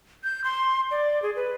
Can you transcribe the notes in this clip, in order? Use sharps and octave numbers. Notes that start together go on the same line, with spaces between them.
G6
C6
D5
G#4
B4